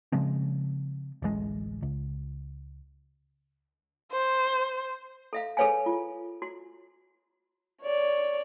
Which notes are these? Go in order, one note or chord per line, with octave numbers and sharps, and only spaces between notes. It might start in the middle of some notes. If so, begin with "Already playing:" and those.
C#3 F3 G#3 C4
D1 A1 G#3
C#2
C5
A4 E5 F5
G#4 A4 B4 C#5 F5 G#5
F4
F#4
C#5 D5